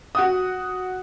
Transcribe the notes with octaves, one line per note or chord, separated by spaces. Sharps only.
F#4 F#5 D#6